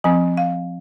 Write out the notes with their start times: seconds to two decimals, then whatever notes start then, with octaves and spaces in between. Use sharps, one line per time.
0.04 F3 C4 G#5
0.37 F5